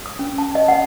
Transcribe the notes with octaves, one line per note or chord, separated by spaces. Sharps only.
D#6
C#4
A5
D#5
F#5